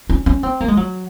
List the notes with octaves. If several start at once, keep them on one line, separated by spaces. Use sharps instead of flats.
C#4
C#4
C4
A#3
G#3
F#3